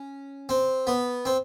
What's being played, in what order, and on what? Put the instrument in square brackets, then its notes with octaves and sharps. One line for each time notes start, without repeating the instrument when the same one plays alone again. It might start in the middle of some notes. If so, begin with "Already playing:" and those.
Already playing: [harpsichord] C#4
C4
B3
C4